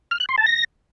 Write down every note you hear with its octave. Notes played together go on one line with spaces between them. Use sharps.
F6
F#6
C6
A5
A#6